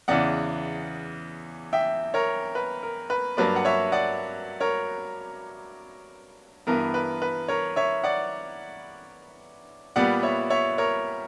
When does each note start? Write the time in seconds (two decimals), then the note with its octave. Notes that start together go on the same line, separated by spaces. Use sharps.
0.08 E2 C#3 E3 D5 F#5
1.73 E5 G5
2.14 A#4 C#5
2.55 B4
2.83 A#4
3.10 B4
3.37 G2 F#3 A#3 B4 D5
3.56 F#5
3.65 C#5 E5
3.92 D5 F#5
4.60 A#4 C#5
6.67 G2 E3 B3 A#4
6.94 B4
7.22 B4
7.48 A#4 C#5
7.76 C#5 E5
8.04 D5 F#5
9.96 A#2 G3 B3 D5 F#5
10.23 C#5 E5
10.50 C#5 E5
10.78 A#4 C#5